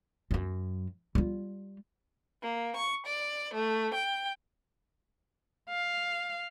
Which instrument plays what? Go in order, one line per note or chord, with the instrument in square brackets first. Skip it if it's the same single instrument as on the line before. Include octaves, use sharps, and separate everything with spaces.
[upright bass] F#2 F#3
G3 F4
[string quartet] A#3
C#6
D5
A3
G5
[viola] F5